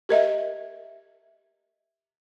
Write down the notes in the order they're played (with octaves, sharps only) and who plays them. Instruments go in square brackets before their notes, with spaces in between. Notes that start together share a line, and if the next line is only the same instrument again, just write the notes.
[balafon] G4 A#4 D#5 E5